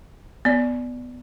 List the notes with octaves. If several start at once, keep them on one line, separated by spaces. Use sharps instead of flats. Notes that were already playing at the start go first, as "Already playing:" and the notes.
B3 D5